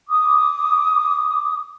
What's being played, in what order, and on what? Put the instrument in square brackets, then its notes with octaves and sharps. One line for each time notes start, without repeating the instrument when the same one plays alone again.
[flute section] D6 D#6